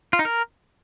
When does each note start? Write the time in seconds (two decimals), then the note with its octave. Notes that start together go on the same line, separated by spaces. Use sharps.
0.13 F4
0.19 D#4
0.25 A#4